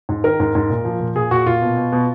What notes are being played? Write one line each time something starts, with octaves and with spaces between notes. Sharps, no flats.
G#2
D#3 A#4
G#2
G#2
A#2
F3
A#2
A#2 G#4
A#2 F#4
A#2 F4
B2
B2
B2